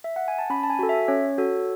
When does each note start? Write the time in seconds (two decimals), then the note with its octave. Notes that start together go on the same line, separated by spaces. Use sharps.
0.04 E5
0.16 F#5
0.28 G#5
0.39 A5
0.50 C#4 B5
0.63 A5
0.70 G#5
0.79 F#4 A4
0.89 E5
1.08 C#4 C#5
1.38 F#4 A4